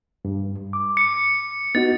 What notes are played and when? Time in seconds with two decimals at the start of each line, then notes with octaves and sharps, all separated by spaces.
0.25 G2
0.73 D6
0.97 C#7
1.75 B3 D#4 F#4 A6